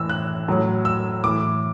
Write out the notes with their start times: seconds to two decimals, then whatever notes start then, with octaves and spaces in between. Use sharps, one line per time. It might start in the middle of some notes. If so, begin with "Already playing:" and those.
Already playing: A2 E3 E6
0.09 F#6
0.48 A2 F#3
0.85 E6
1.24 A2 E3 D6